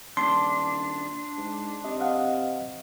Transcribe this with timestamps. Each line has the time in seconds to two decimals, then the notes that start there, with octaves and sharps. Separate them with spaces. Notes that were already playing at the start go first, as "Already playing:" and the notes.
0.17 D#1 D4 C6
1.38 G#2
1.84 C3 D#5
2.00 D#5 F5 F#5